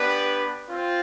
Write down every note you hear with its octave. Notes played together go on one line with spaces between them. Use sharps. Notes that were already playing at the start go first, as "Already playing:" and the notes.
Already playing: B3 D4 G4 B4 D5
C4 F4